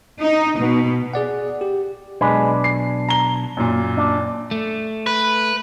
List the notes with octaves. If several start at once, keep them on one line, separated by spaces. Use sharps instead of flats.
D#4
B2
G#4 D5 F#5
G4
B1 G#3 D4 B4
C7
A#5 G7
F#2 A#2
D4
A3
B4